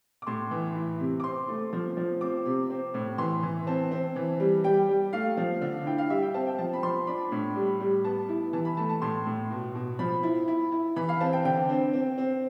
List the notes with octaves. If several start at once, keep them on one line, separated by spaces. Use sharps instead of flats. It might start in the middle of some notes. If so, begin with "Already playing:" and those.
D6
A2 C6
E3
E4
C3
D6
C4 C6
A3
F3
F3
C4 D6
C3
C4
A2
E3 C6
E3
C4 A5
C4
E3
G3
G3 G5
G3
A3 F5
F3
D3
E4 G5
F5
G3 E5
G5
C4 A5
G5
F3 A5
B5
F3 C6
D4 B5
A2
G3
G3
B3 A5
E4
E3 A5
B5
A3 A5
A5
A2 C6
A2
B2
B2
F3 B5
E4
E4
E4
E3 B5
F5
C4 A5
G5
D3 G5
C4
C4
C4